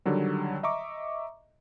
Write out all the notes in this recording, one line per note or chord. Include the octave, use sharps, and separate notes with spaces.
D3 D#3 F#3 G3
D#5 E5 A#5 C#6 D6